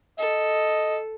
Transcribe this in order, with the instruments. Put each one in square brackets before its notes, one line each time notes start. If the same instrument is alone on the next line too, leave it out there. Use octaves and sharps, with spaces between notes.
[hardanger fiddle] A4 [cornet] D#5